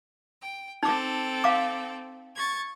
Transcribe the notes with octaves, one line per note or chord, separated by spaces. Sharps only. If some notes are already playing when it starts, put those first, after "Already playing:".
G5
C4 D#4 A4 G5 D6
F5 A#5 D6
C#6 G#6 A6